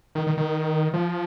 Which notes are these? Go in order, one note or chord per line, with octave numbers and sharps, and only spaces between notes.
D#3
D#3
D#3
F3